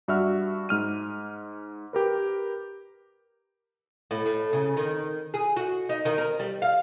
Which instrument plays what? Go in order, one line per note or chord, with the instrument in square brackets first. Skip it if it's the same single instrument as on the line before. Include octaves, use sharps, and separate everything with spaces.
[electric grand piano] G2 F#4 E5 F6
G#2 F6 D#7
G4 A#4 B4
[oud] A2
A2
C#3
D#3
G#4
F#4
D#4
D#3
A#4
G3
F5